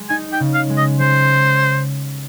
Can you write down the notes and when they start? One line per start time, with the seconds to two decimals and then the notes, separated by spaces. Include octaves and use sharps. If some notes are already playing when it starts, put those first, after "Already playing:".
Already playing: G#3
0.09 D#4 G#5
0.32 G5
0.40 C#3
0.54 F5
0.70 G#3
0.77 D#5
1.00 G#3 C5